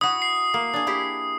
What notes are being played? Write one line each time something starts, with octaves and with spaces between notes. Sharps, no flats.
E4 F#4 D#6
C7
A#3
D4 G#4
E4 G4 G#4